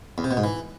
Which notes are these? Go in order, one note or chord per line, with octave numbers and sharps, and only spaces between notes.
E2
C3
B2
G#2
E3